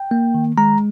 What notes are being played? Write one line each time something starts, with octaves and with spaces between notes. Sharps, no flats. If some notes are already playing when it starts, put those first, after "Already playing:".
Already playing: G5
A#3
D#3
G#3 A#5